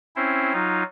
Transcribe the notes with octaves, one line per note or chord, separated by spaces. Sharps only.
C4 C#4 E4 C5
F#3 D#4 F4